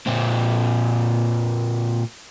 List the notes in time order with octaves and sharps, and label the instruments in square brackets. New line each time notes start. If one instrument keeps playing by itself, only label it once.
[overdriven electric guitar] A#2 C4